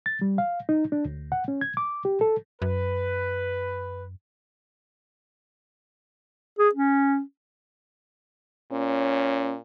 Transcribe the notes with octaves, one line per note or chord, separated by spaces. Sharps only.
A6
G3
F5
D#4
D4
D2
F#5
C#4
G#6
D6
G4
A4
F#2 B4
G#4
C#4
A#2 C#4